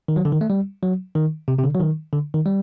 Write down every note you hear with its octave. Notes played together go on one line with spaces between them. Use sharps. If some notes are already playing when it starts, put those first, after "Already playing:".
D#3
F#3
D3
D#3
A3
G3
F#3
D#3
C3
C3
D3
F#3
D#3
D3
D#3
G3